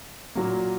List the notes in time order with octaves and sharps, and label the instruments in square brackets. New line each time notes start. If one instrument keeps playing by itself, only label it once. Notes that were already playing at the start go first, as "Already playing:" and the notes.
[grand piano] A#2 F#3 A#3